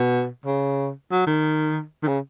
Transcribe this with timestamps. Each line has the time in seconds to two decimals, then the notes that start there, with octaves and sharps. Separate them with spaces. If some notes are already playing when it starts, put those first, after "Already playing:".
Already playing: B2
0.46 C#3
1.11 F#3
1.27 D#3
2.02 D#3
2.08 C#3